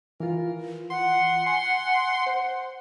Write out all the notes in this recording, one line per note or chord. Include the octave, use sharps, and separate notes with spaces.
E3 F4 A#4
F#5 C6
G#5 C6
C5